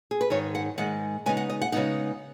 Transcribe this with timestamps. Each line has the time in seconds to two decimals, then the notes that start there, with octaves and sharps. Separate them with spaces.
0.11 G#4
0.21 B4
0.30 G#2 D#3 G#3 C#5
0.55 F#5
0.78 G#2 D#3 G#3 F#5
1.26 C#3 G#3 B3 D#4 G#5
1.37 F#5
1.50 D#5
1.61 F#5
1.72 C#3 G#3 B3 D#4 F#5